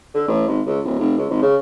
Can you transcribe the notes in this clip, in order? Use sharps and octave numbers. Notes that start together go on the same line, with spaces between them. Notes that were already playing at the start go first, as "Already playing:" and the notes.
D3
A1
G#1
C#2
D1
F1
C#2
G#1
C#3